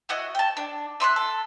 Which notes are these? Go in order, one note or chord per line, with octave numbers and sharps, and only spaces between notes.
E4 F#4 D#5
G5 A5
D4
E5 C6 C#6 F#6
A4